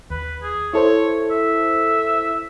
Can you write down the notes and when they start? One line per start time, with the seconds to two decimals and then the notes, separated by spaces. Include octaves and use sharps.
0.10 D#2 B4
0.42 G#4
0.73 E4 A4 C5 C#5
1.31 E5